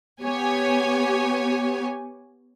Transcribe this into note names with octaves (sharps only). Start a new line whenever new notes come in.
B3 G4 C#5 G#5